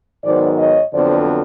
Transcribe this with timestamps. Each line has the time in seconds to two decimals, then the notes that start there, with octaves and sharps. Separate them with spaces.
0.23 G#2 D#3 F#3 B3 C5 D5
0.57 C#5 D#5
0.92 F2 D3 F#3 B3 C5 D5